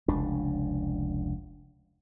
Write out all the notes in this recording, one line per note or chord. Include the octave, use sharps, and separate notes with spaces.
F1 C#2 D4